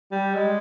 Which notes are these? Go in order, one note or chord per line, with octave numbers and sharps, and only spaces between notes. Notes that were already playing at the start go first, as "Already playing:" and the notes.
G3
G#3